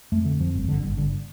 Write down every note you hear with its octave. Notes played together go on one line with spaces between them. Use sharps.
F2 A3
D3
F2 F3
G1
G1 D3
G1
G1 D3